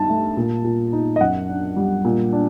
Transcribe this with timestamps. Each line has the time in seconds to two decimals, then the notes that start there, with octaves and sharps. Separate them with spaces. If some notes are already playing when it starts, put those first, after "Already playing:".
Already playing: G2 D#4 A5
0.09 A3
0.37 A#2
0.64 A#2
0.93 D#4
1.16 D#5
1.21 F#2 F#5
1.49 D4
1.77 G3
2.05 A#2
2.33 D4